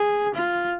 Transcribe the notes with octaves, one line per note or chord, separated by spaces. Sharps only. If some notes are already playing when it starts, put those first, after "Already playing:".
Already playing: G#4
F4